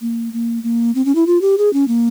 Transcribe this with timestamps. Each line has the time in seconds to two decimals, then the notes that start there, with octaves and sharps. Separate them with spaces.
0.01 A#3
0.33 A#3
0.63 A#3
0.95 C4
1.05 C#4
1.15 E4
1.26 F4
1.41 G4
1.58 G#4
1.73 C#4
1.88 A#3